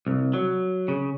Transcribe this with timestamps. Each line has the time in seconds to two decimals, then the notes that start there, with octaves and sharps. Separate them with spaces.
0.07 C2
0.34 F#3
0.88 C#3